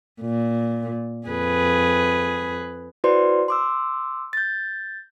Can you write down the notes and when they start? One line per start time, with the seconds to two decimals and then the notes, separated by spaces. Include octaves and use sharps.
0.21 A#2
1.27 F2 G#4 B4
3.04 E4 F#4 B4 C5 D5 C6
3.48 C6 D6 E6
4.33 G6 A6